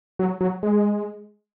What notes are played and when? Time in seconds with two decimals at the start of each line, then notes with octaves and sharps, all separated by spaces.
0.19 F#3
0.41 F#3
0.63 G#3